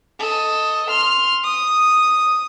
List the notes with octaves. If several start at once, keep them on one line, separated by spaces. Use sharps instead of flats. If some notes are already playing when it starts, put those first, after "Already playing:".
A4 D#5
C6 F6
D#6